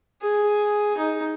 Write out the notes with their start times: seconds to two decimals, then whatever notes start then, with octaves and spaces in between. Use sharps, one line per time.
0.22 G#4
0.97 D#4